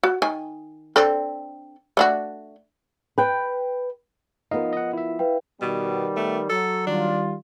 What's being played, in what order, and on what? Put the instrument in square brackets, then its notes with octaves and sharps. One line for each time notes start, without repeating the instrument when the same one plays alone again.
[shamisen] F#4
D#3 G#5
C4 D4 A4
A3 D4 F#4
[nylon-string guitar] B4 G5
[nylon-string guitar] F3 B3 A#4 [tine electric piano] D#4 D#5 F5
[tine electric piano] D#5 F#5
E4 E5
[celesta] B4 F5 G5
[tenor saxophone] B2 [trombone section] D#3 G3 B3
[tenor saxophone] A3
[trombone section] F#3 [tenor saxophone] A4
[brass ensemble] D#3 G3 F4 [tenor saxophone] D4